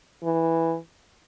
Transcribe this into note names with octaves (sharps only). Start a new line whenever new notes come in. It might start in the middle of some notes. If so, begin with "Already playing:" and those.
E3